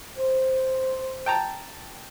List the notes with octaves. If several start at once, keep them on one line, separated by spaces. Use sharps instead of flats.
C5
G5 A5 A#5